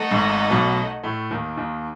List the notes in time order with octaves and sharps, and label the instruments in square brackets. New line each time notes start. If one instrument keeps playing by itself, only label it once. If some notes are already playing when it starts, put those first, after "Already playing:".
Already playing: [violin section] A3 D#4 A4 D#5 F#5
[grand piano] G#1 G#2
B1 B2
A2 A3
D#2 D#3
D#2 D#3